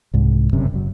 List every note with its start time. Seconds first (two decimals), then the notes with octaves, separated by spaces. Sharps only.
0.14 C2 G#2
0.53 G1 F#2 C3 C#4
0.72 F#1 F#3